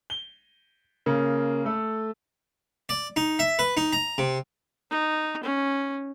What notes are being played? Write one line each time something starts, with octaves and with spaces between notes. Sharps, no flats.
G7
C#3 A#3
A3 A4
D5
D#4
E5
B4
D#4
A#5
C3
D#4
C#4